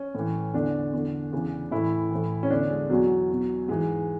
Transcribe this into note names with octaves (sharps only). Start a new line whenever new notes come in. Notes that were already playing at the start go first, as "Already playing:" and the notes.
Already playing: C#4
A2 E3
E2 D3 D4
E2 D3
E2 C#3 E3
A2 E3 E4
A2 E3
C#4
E2 D3 D4
G#3
E2 B2 F#3
E2 B2
G#2 E3 G#3